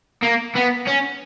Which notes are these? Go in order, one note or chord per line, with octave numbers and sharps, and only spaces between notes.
A#3
B3
C#4